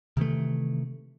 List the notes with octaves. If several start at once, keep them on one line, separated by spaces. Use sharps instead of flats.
C3 D#3 E3 A3